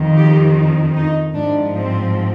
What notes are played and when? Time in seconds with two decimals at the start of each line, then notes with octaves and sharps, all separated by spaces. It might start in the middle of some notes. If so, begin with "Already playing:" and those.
Already playing: F2 D#3
0.16 G4
0.95 D#4
1.34 G#2 F3 D4
1.74 C4